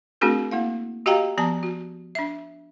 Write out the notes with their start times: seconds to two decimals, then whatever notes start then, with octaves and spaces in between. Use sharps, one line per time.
0.21 A3 C4 D4 F#4 G#4 A#4
0.51 A#3 E4 F5
1.06 F#4 G4 D#5 F5 G5 A#5
1.38 F3 B3 A5 A#5
1.63 F#4
2.15 D4 E5